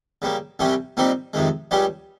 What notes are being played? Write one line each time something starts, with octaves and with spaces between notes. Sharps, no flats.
C#3 G3 A#3
C2 C3 G3 C#4 G4
A#2 G3 C4 D#4 G4
F2 C3 D#3 G#3
C#2 C#3 G3 C#4 G4